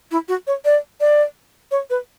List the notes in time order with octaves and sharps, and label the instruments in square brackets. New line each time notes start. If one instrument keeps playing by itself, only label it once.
[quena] E4
F#4
C#5
D5
D5
C#5
B4